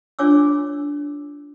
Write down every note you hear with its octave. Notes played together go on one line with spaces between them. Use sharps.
D4 F4 C#5 G#5 D6 E6